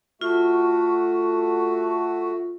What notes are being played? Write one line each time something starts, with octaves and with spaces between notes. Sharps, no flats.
A3 F4 F#4